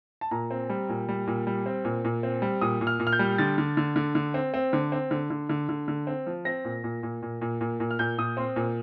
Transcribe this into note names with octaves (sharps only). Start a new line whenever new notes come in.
A5
A#2 A#5
C4
G3
A#2
G3
A#2
G3
C4
A#2
A#2
C4
G3
A#2 D#6
A#2
F6
A#2
F6
G6
G3
D3 A6
D3
D3
D3
D3
C4
C4
D3
C4
D3
D3
D3
D3
D3
C4
F3
C4 A#6
A#2
A#2
A#2
A#2
A#2
A#2
A#2
F6
A#2 G6
A#2 D#6
C4 C6
A#2